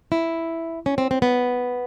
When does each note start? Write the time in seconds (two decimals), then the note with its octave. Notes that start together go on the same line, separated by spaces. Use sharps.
0.12 E4
0.86 C#4
0.98 C4
1.11 C4
1.22 B3